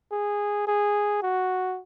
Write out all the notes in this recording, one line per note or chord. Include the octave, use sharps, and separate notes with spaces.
G#4
G#4
F#4